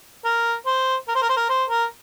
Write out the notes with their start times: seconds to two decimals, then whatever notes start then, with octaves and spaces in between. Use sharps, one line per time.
0.25 A#4
0.66 C5
1.09 A#4
1.15 C5
1.22 A#4
1.29 C5
1.37 A#4
1.49 C5
1.70 A#4